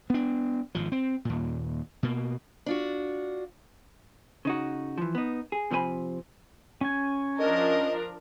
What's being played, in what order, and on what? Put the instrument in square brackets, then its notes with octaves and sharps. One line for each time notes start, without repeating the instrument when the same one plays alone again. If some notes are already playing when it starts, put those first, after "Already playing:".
[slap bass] B3 D4
G#1 F3
C4
D#2 A#2
B2 A#3
[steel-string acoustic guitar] D4 F4 F#4
[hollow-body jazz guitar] C#3 D#4 F#4
E3 F3
B3 D#4
G#4
C3 F3 C4 B4 G#5 B5
[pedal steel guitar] C#4 G#5
[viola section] F3 D4 A#4 [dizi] D#5